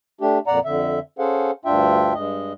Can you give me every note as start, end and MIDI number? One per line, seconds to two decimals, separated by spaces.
0.21 0.39 57
0.21 0.39 62
0.21 0.39 67
0.47 0.59 41
0.47 0.59 46
0.47 0.59 74
0.47 0.59 78
0.47 0.59 82
0.65 0.99 41
0.65 0.99 50
0.65 0.99 76
1.19 1.51 61
1.19 1.51 68
1.19 1.51 69
1.19 1.51 72
1.19 1.51 77
1.19 1.51 78
1.65 2.13 38
1.65 2.13 43
1.65 2.13 62
1.65 2.13 65
1.65 2.13 76
1.65 2.13 79
2.14 2.53 43
2.14 2.53 56
2.14 2.53 75